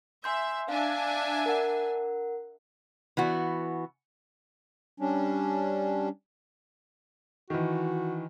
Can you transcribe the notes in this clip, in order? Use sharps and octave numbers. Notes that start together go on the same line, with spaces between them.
E5 G#5 C6 G6
D4 E5 F5 G#5
A#4 F#5
E3 B3 F#4
G3 C#4 D4
D#3 E3 F#4